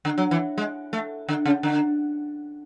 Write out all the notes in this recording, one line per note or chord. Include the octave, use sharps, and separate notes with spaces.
D3
F#3
E3
G#3
A3
D3
C#3
D3